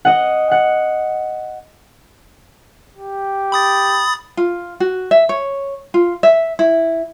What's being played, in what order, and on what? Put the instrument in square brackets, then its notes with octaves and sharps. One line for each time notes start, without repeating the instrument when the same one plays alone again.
[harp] D#5 F#5
F#5
[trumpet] G4
[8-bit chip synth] B5 D#6 A6
[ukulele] F4
F#4
E5
C#5
F4
E5
E4